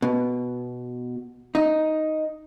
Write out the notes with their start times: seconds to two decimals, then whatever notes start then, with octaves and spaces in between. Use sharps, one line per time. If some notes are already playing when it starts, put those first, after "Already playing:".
0.02 B2
1.55 D#4